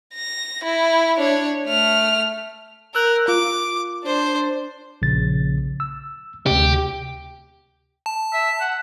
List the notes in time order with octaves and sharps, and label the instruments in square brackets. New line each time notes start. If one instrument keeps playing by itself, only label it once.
[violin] A#6
E4
D4 C#5
A3 F6
[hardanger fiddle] A#4 [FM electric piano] E6 F#6 G6
[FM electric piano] F4 [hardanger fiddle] D6
[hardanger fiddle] D4 C5
[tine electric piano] A#1 C#3 A6
E6
[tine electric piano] D2 C3 [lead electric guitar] G4
[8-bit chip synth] A5
[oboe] E5
F#5